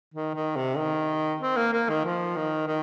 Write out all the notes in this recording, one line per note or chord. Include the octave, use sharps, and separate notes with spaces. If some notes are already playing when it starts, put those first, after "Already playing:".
D#3
D#3
C3
D#3
C4
A#3
A#3
D#3
F3
D#3
D#3